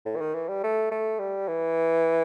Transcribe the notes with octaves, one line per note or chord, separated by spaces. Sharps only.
A2
E3
D#3
E3
G3
A3
A3
G3
E3